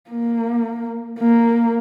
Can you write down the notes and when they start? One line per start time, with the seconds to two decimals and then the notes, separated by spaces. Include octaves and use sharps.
0.10 A#3
1.19 A#3